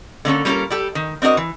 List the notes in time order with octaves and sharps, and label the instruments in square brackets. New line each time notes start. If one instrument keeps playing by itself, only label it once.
[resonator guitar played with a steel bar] D3 A#3 C#4 A4
G3 A#3 C#4 F4 A4 A#4
G3 G4 A4
D#3
C4 D4 F#4 A#4 D#5
E3